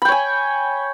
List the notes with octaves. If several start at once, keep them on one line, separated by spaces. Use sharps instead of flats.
C#5 G5 G#5 B5